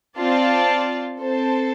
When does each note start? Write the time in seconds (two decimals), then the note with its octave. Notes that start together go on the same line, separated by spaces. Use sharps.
0.18 C4 F4 D5 F5 A5
1.19 C4 A4 C5 A5